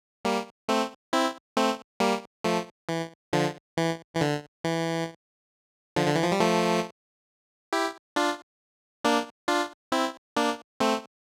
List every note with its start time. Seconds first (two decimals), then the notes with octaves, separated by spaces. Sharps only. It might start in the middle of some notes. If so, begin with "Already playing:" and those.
0.25 G3 A#3
0.69 A3 C4
1.13 C4 E4
1.57 A3 C4
2.00 G3 A#3
2.44 F3 A3
2.89 E3
3.33 D3 F3
3.77 E3
4.15 E3
4.21 D3
4.64 E3
5.96 D3 F3
6.07 D3
6.15 E3
6.24 F3
6.32 G3
6.40 F3 A3
7.73 E4 G4
8.16 D4 F4
9.04 A#3 D4
9.48 D4 F4
9.92 C4 E4
10.36 A#3 D4
10.80 A3 C4